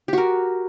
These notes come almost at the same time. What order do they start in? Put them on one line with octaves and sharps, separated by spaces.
G4 F#4 A#4